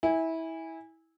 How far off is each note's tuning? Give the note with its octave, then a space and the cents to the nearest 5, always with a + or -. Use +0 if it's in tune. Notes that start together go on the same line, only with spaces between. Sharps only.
E4 -20 G#5 -20